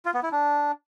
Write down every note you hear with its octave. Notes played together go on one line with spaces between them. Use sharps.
F4
B3
E4
D4